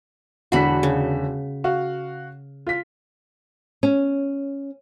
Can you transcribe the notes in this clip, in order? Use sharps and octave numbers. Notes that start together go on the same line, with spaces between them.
E1 D3 F#4 B5 B6
C#3
F#4 F5
F4 B6
C#4